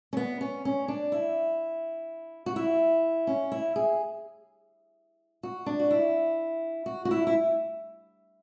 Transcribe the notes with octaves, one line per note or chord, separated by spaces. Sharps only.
C#4
B3
C#4
C#4
D4
E4
F#4
E4
C#4
E4
G#4
F#4
D4
F#4
E4
F#4
F#4
E4
E4